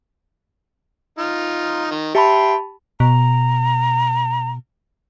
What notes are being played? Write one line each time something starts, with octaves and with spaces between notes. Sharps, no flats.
D#4 F4
D#3
G4 E5 G5 A5 B5 C6
B2 A#5